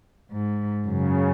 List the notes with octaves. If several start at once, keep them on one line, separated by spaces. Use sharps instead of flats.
G#2
F#2 C#3